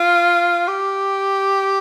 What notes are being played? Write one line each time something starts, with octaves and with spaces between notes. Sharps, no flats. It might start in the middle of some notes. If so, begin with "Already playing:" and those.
Already playing: F4
G4